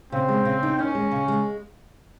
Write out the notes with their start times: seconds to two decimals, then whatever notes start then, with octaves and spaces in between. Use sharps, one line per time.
0.12 C#3 C4
0.28 G#3
0.45 C#3
0.63 D#4
0.79 D#2 C#4
0.95 G#3
1.11 C#3
1.28 G#3